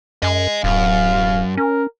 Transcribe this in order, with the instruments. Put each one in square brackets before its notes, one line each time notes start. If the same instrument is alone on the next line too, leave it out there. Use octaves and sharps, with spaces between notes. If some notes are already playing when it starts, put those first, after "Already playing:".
[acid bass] F#2 [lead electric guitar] D#5 G#5
[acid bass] D1 [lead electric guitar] F#2 [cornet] F5
[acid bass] C#4 [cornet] A#4